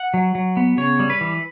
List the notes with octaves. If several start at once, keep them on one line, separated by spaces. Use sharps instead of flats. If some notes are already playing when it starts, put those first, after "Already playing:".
Already playing: F#5
F#3
F#3
B3
C#3 C#5
G3
B4
E3